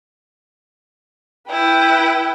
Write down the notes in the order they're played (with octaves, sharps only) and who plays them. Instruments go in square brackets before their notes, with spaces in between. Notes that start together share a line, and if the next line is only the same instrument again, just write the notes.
[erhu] E4 [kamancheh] B4 G5